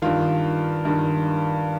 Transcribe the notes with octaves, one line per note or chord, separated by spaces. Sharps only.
G2 D#3 F4
G2 D#3